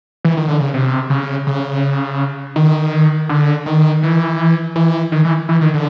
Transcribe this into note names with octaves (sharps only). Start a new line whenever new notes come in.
E3
D#3
D3
C#3
C3
C#3
C#3
D#3
D3
D#3
E3
E3
D#3
E3
E3
D#3
D3